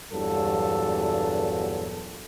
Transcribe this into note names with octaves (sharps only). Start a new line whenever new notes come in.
E2 G2 A#2 F#3 A4